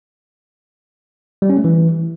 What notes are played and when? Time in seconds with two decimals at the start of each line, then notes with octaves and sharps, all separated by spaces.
1.42 G3
1.50 C#4
1.57 A3
1.64 E3